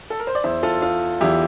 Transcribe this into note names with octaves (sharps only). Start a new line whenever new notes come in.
A4
A#4
C5
D5
E2 E3 C5 E5
F4 A4
F4
E2 E3 E4 G4